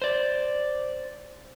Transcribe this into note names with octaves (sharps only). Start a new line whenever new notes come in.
C5 D5